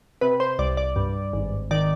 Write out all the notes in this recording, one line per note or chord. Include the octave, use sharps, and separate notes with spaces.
C3 B4
C5
C2 D5
D5
G2
G#1
D#3 D5